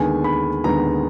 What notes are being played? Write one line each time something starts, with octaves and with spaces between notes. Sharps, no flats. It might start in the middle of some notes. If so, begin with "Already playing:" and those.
Already playing: D#2 D3 G#3 B3 G#5
B5
D#2 D3 G#3 B3 A#5